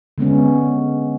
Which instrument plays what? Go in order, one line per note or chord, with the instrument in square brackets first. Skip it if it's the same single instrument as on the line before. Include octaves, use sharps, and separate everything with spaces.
[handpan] D3 G#3 B3 C#4